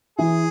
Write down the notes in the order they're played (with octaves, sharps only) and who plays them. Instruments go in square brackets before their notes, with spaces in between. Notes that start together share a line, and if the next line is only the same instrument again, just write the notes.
[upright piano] E3 [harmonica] G#4